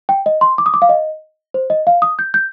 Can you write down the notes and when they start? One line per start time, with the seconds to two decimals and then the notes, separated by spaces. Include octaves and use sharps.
0.09 G5
0.26 D#5
0.41 C6
0.58 D6
0.66 D#6
0.74 D6
0.82 F5
0.89 D#5
1.54 C5
1.70 D#5
1.87 F5
2.02 D#6
2.19 G6
2.34 G6